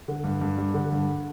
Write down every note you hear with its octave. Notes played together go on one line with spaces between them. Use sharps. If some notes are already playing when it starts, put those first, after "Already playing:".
D3
G2
G2
G3
D3
G2